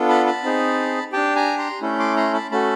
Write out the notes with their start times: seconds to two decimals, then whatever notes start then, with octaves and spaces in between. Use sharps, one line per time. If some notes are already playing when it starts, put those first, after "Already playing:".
Already playing: B3 D4 F4 A4
0.09 A5 B5
0.26 A5 B5
0.44 C4 D#4 G#4
1.13 D4 G4 G5 A5
1.35 G#5 A#5
1.58 A#5 C6
1.82 A3 C#4 E4 A4
1.99 C6 D6
2.16 A#5 C6
2.34 A5 B5
2.51 A3 C#4 F#4 A4 A5 B5